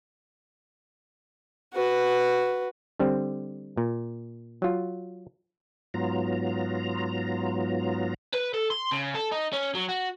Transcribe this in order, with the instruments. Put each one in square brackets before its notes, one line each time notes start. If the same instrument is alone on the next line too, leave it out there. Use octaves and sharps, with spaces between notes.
[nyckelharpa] F#4 B4
[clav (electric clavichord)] D3 G3 C4
A#2
F#3 F4
[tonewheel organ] G#2 F#3 B3 F4 A#5
[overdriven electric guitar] B4
A4
C6
C#3
A4
D#4
C#4
F#3
F#4